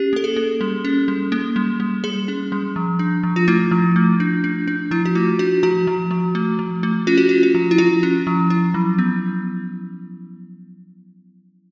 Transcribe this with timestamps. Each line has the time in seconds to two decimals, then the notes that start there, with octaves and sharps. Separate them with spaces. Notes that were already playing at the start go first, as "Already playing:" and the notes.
Already playing: C#4 G4
0.13 A#3 A4
0.24 G#4
0.36 A#3
0.61 G3
0.85 C#4
1.08 G3
1.32 A#3
1.56 G3
1.80 G3
2.04 G3 G#4
2.28 C#4
2.52 G3
2.76 F3
2.99 D4
3.23 F3
3.36 F4
3.48 A3 E4
3.71 F3
3.96 A3
4.20 D4
4.44 D4
4.68 D4
4.91 F3 E4
5.06 F#4
5.15 A3 F4
5.39 D4 F#4
5.63 F3 F#4
5.87 F3
6.11 F3
6.35 A3
6.59 F3
6.83 A3
7.07 C#4 F4
7.18 F#4
7.29 C#4 F4
7.43 F4
7.55 F3
7.71 E4
7.78 F3 F4
8.03 C#4
8.27 F3
8.50 E4
8.74 F#3
8.98 B3